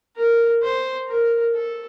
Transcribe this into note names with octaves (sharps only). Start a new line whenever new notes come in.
A#4
C5
A#4
A4